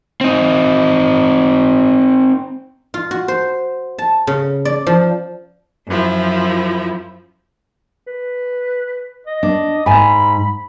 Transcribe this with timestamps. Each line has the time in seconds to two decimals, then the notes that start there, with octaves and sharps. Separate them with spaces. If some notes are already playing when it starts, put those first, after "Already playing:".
0.21 C4 D#4
2.94 F4
3.11 F#4
3.28 C5
3.98 A5
4.27 C#3
4.65 D5
4.87 F3
5.87 F#2 F3 E4
8.07 B4
9.26 D#5
9.43 D4
9.86 G#2 G#5 B5